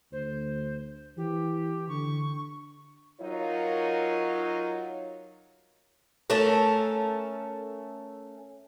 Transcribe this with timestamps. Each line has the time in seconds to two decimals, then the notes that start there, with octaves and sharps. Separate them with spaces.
0.12 D2 C5
1.17 E3 G4
1.89 D3 C#6
3.21 F#3 D#4 F4 A#4 C#5
6.30 A3 C#4 A4 A#4